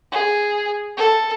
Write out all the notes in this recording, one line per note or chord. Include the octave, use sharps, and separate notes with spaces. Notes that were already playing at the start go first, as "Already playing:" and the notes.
G#4
A4